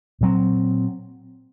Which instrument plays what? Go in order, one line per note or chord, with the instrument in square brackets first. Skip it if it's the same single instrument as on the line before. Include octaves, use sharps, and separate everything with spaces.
[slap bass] A#2 F#3 C4